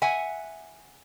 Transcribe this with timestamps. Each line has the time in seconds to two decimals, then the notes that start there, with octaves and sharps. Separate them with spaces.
0.02 E5 F#5 G#5